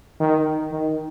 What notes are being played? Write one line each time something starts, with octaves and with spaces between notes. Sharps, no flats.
D#3
D#3